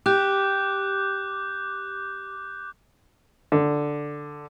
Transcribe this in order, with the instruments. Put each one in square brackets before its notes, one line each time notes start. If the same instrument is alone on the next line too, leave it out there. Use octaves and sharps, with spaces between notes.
[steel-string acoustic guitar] G4 [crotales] D6 F#6 G6
[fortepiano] D3